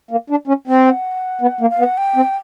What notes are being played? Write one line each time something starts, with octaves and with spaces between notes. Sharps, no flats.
A#3
D4
C#4
C4
G5
F#5
B3
A#3
F5
B3
F#5
G5
C4